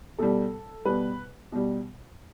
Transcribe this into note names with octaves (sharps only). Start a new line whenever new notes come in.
B2 G3 A4
B2 G3 B4
B2 G3